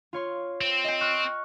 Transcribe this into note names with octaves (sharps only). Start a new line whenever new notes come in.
F4 C#5 C6
C4
D#5 G5
C#6 F6 F#6